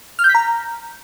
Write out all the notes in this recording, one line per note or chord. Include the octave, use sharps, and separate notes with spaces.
F6
G6
B6
A#5